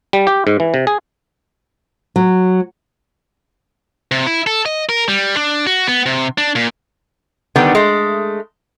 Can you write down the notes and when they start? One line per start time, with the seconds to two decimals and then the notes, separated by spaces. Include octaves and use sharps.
0.13 G3
0.27 G4
0.47 G#2
0.60 E3
0.74 C3
0.87 G#4
2.16 F#3
4.11 C3
4.27 E4
4.47 A4
4.66 D#5
4.89 A#4
5.09 G3
5.37 D4
5.67 F#4
5.88 B3
6.06 C3
6.38 D4
6.55 A#2
7.56 D3 D#3 G3 B3 D4
7.75 G#3 A3